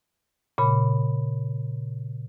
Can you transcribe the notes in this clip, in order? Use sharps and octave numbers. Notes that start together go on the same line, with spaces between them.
A#2 C#3 B5